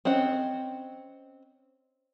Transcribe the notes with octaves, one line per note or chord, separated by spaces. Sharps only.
C4 C#4 D#5 F#5